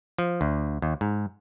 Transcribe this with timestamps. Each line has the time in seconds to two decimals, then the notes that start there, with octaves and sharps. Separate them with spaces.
0.18 F3
0.41 D2
0.82 D#2
1.01 G#2